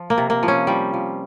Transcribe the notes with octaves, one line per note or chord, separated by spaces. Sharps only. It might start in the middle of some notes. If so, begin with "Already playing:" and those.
Already playing: F3
A#3
C3
A#3
F3
C#4
F3 G3
F3